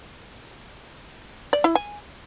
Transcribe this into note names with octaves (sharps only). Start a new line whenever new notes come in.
D5
E4
G#5